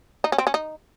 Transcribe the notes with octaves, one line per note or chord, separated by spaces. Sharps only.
D#4
C#4
C4
C#4
D#4